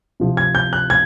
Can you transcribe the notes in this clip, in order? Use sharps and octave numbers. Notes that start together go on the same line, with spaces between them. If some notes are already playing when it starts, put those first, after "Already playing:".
C3 F3
G#6
G6
F#6
G#6